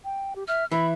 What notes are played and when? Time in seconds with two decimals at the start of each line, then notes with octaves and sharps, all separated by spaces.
0.04 G5
0.36 G4
0.48 E5 F6
0.72 E3 E5 B5